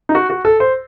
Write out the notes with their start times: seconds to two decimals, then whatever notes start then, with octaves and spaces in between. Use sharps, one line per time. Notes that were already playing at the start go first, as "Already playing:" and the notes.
0.09 D#4
0.15 F#4
0.30 F#4
0.45 A4
0.60 C5